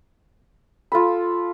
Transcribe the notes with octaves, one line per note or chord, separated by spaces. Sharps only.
F4 A4 B5